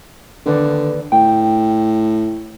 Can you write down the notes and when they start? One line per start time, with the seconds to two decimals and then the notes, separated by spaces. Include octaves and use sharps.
0.46 D#2 D3 B4 D5
1.12 A2 G5